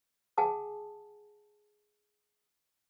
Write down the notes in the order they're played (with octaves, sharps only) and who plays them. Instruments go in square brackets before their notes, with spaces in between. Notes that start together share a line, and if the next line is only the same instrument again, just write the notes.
[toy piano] G#4 F#5 G#5 A5 D#6